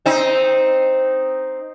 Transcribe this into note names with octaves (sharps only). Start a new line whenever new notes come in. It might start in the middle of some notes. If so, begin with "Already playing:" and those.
C4 D#4